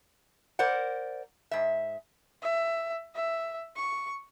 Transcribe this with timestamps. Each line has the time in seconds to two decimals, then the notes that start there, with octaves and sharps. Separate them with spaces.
0.59 A#4 C5 D5 F#5
1.51 G#2 E5
2.42 E5
3.15 E5
3.76 C#6